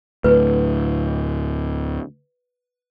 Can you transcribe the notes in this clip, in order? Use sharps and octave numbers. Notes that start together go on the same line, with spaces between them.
D2 A2 B4